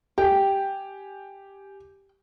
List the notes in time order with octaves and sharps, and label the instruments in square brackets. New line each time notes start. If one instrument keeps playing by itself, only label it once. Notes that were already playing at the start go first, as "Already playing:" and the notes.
[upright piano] G4 G#5 [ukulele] G5